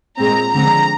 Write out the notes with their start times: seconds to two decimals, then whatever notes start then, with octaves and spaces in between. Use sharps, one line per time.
0.18 A#2 G#3 C4 A#5
0.54 D3 F3 G#3 C4 A#5